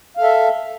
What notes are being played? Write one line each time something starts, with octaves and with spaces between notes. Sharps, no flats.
A4 E5 F5